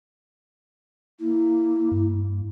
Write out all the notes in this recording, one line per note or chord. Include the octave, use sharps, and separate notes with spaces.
A#3 E4
G2